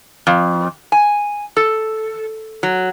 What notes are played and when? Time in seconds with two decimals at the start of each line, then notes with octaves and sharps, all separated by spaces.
0.27 F2
0.92 G#5
1.57 A4
2.63 F#3